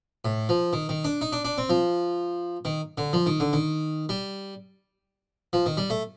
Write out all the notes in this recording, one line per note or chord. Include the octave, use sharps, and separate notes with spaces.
A2
F3
D#3
D#3
D4
D#4
D4
D4
C4
F3
D#3
D3
F3
D#3
D3
D#3
G3
F3
D#3
G3
A3